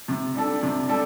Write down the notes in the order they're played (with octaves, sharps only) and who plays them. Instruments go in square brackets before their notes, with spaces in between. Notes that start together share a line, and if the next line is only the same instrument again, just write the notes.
[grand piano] C3
G3 D4 A4
C3
G3 D4 A4